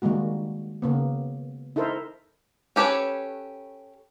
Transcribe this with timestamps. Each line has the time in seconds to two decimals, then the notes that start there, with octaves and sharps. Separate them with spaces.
0.02 D#3 G3 G#3 A#3 F#4
0.82 C#3 A#3 B3
1.76 D#4 E4 A4 A#4 C5
2.76 C#4 G4 A4 B4 C#5